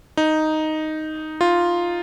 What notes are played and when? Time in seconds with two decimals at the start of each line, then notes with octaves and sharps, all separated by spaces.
0.17 D#4
1.41 F4